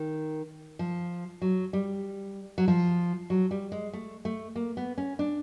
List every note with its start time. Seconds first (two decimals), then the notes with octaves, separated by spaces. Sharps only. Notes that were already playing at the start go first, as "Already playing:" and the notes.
Already playing: D#3
0.79 F3
1.42 F#3
1.73 G3
2.58 F#3
2.68 F3
3.30 F#3
3.51 G3
3.72 G#3
3.93 A3
4.25 A3
4.56 A#3
4.77 B3
4.98 C#4
5.19 D4